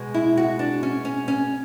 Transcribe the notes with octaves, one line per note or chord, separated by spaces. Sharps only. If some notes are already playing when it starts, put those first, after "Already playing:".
Already playing: B2 G#3 B3
E4
F#4
D4
C#4
C#4
C#4